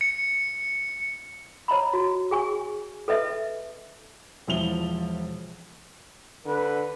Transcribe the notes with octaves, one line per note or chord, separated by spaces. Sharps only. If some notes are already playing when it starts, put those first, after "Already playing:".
C#7
C#5 D#5 A#5 B5
F#4
G#4 G#5 C#6
A4 B4 D#5 E5
E1 F3 E4 F7 G7
D3 B4